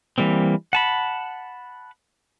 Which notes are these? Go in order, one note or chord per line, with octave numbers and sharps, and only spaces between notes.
E3 G3 A#3 C4
F#5 A5 B5